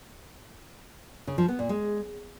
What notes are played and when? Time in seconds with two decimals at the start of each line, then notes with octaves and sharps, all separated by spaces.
1.27 C#3
1.38 F3
1.48 B3
1.59 A#2
1.69 G#3